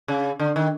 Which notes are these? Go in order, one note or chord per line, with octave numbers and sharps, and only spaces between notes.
C#3
D3
D#3